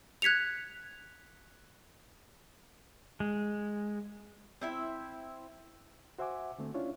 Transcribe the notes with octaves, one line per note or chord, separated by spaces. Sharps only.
F#6 G#6 B6 C#7 F7
G#3
C4 E4 E5
F#4 C5 E5 F#5 G#5 D6
D3 A3 C4
C#4 D4 E4 F4 C#5